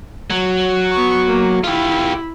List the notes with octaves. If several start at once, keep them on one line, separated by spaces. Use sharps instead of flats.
F#3
B3 C#6
A#3
E4 F4 G4